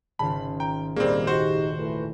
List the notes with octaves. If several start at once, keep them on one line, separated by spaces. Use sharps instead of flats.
G#1 C#3 F4 A5 B5
G5 A#5
D#1 G3 A#3 C4 G#4
D#4 F#4 G4 C5
E3 A3 B4